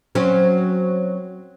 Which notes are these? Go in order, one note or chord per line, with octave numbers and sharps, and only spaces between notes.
F#3 C4 C#4